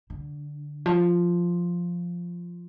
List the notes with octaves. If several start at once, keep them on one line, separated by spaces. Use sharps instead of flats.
D3
F3